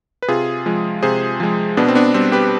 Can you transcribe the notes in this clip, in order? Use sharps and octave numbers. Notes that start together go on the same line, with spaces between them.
B4
C3 F4 G#4
F3 G#3
C3 G#4 C5
F3 G#3
B2 B3 D4
C4
B3 D4
G3 C4
G4 B4